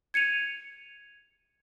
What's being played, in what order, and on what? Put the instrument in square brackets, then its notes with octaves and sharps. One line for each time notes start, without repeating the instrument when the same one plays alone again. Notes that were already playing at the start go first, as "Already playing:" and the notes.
[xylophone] G#6 C#7 D#7 F7